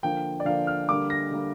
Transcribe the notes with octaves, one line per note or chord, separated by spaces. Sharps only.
D3 F3 A#3 G5
D5
D3 F3 A#3 F5
F6
D3 G3 A#3 D6
A#6
D3 G3 A#3